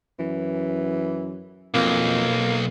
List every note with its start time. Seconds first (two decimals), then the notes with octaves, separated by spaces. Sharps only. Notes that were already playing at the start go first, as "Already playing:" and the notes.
0.19 F#2 E3
1.74 B1 F2 A#3